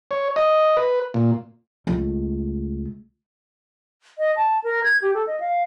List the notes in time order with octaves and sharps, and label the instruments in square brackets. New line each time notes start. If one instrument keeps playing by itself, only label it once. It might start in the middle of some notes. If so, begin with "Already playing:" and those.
[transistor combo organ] C#5
D#5
B4
A#2
[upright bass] C#2 A3
[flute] D#5
A5
A#4
G#6
G4
A4
D#5
F5